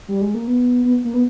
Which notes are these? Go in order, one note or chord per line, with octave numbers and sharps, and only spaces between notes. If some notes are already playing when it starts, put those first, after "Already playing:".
G3
G#3
A#3
B3
B3
A#3
B3